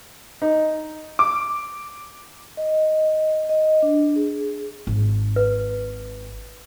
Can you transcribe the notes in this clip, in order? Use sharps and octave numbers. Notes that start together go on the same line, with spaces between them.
D#4
D6
D#5
D#5
D4
G#4
G#1
B4